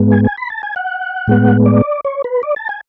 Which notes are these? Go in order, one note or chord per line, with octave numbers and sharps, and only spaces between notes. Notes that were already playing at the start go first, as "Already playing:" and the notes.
Already playing: G#2 G#3 B3
G#5
G#5
B5
A5
G#5
F#5
A2 G#3 B3
D5
C#5
B4
D5
A5
G#5